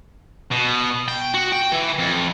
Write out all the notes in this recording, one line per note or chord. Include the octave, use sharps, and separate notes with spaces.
B2
G5
F#4
G5
E3
F2